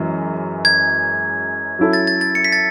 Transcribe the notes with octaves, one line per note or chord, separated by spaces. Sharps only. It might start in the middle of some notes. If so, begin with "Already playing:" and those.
Already playing: F#2 E3 G#3
G#6
F#3 C#4 E4 A4
A6
A6
A6
C#7
B6
A6